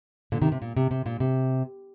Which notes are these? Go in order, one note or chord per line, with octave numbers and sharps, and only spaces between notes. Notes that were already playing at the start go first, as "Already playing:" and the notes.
A#2 D3
C3 D#3
C3
A#2
C3
C3
A#2
C3